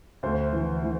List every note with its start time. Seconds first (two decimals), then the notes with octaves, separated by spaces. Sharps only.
0.23 D2 C5
0.53 E3
0.83 E3